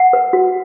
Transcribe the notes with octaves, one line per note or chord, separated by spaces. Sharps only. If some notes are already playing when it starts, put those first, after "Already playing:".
Already playing: F#5
B4
F#4